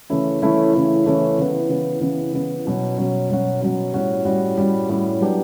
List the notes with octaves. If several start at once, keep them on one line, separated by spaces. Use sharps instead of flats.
C#3 E3 A3 C#4 E4
C#3 E3 A3 C#4 E4
C#3 E3 A3 C#4 E4
C#3 E3 A3 C#4 E4
C#3 E3 B3
C#3 E3 B3
C#3 E3 B3
C#3 E3 B3
B2 F#3 C#4 F#4
B2 F#3 C#4 F#4
B2 F#3 C#4 F#4
B2 F#3 C#4 F#4
A2 G3 C#4 F#4
A2 G3 C#4 F#4
A2 G3 C#4 F#4
A2 G3 C#4 F#4
F#3 B3 D4 G4